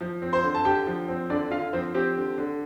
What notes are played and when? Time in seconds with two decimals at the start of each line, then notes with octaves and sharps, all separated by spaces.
0.01 F3
0.22 C4
0.33 C5 C6
0.43 D3
0.55 A5
0.65 D3 G4 G5
0.87 F3
1.08 C4
1.30 D3 D4 D5
1.51 D3 F4 F5
1.73 F3 C4 C5
1.94 C4 G4
2.16 D3
2.38 D3